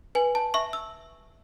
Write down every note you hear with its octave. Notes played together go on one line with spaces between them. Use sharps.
B4 G#5
A5
E5 C#6
E6